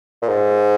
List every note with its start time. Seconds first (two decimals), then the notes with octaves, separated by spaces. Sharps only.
0.22 A#2
0.28 G#2